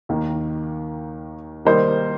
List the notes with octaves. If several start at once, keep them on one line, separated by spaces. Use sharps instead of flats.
D#2 D#3 A#3
D#3 G3 A#3 D#4 C5